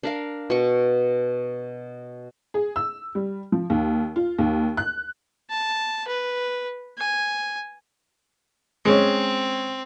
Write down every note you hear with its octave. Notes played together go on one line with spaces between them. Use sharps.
D4 A#4 F5
B2 C#6
G#4
E6
G3
F3
D#2
F4
D#2
F#6
A5
B4
G#5
G#3 C4 C#4